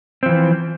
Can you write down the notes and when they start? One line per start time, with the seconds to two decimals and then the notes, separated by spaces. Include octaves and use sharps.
0.23 C4
0.26 F3
0.29 E3